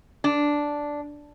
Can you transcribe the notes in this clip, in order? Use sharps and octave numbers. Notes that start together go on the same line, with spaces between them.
D4